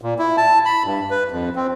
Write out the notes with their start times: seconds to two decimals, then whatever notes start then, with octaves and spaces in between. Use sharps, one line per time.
0.02 A#2
0.19 E4
0.37 A5
0.65 B5
0.84 G2
1.11 B4
1.31 F2
1.56 C4